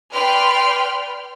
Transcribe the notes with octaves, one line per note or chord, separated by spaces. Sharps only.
B4 D5 G5 C6 F6